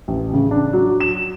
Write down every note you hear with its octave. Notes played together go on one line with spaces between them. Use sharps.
A1
C#3
D4
F#3
E7